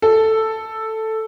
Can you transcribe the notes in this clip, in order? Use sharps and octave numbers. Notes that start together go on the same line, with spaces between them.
A4